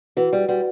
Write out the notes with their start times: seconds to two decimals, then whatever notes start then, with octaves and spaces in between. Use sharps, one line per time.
0.17 E3 F#4 B4 F#5
0.33 G3
0.49 G3 F#4 B4 F#5